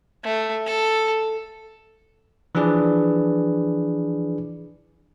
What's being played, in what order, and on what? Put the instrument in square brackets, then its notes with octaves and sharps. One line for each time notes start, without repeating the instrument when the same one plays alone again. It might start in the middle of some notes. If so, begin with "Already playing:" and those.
[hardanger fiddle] A3
A4
[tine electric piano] E3 F3 D4 G#4 B4 D5